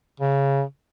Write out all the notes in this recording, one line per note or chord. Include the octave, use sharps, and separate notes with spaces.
C#3